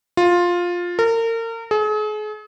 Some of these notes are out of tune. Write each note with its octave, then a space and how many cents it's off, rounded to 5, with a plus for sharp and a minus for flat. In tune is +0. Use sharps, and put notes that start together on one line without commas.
F4 +10
A#4 -35
G#4 +40